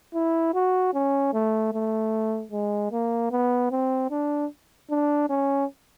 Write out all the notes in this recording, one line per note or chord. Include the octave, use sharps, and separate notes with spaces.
E4
F#4
C#4
A3
A3
G#3
A#3
B3
C4
D4
D4
C#4